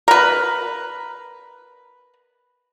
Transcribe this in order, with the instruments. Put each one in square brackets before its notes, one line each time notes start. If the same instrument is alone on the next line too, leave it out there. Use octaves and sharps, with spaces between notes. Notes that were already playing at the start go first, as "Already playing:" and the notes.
[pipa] A#4 B4